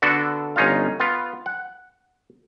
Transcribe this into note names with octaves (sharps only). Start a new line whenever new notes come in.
D3 B3 D4 F#4 A4
G1 C#4 D#4 F4 F5
B3 F4
F#5